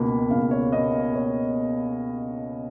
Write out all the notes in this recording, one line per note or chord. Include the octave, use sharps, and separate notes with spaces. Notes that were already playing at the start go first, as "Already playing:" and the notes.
Already playing: C#2 B2 A#3 B5
C#2 F5
C#5
B2 A#3 D#5
F5
C#5